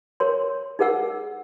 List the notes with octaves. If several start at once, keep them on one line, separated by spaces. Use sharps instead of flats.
A#4 C#5 C6
D#4 G#4 A#4 F#5 E6